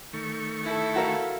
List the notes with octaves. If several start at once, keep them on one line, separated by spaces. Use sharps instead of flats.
D#3 A3 C#6
E4 A4
F#4 A#4 F5